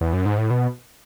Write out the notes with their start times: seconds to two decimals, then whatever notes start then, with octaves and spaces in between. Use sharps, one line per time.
0.01 E2
0.13 F#2
0.26 G#2
0.38 A2
0.50 B2